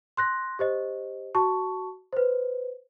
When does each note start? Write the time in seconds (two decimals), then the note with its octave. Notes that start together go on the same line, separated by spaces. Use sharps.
0.17 C6 F#6 A#6
0.59 G4 C5 D#5
1.35 F#4 A5 C#6
2.13 B4 C5